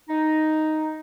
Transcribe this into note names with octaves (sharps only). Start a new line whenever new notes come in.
D#4